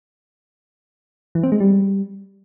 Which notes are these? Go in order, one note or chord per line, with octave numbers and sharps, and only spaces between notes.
E3
C4
G#3
G3